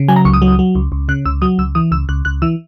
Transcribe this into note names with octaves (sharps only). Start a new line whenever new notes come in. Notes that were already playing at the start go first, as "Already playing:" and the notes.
Already playing: C#3
F#3 G#5
A#5
C#2 C#6
D#6
F#3
F#3
C#2
C#2
C#3 F#6
C#2 E6
F#3 D#6
C#2 E6
E3 D#6
C#2 E6
C#2 F#6
C#2 F#6
E3 E6